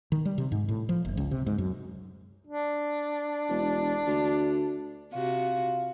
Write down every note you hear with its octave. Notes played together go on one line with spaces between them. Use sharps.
D#3
G3
C3
G#2
A2
F3
F#1
C#2
C3
G#2
F#2
D4
E1
D2
C3 F4 F#4